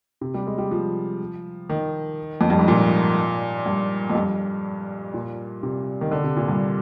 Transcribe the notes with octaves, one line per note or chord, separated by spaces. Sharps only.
C3
G3
G#3
G3
F3
D#3
F2
G2
G#2
A#2
G2
F2
G2
A#2
C3
D#3
D3
C3
A#2
G2